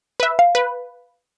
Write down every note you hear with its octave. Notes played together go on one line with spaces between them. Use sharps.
B4 E5
F5
B4